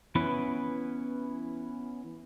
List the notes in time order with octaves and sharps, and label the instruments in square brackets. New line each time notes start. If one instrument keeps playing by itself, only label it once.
[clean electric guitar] E3 B3 C#4 E4 B4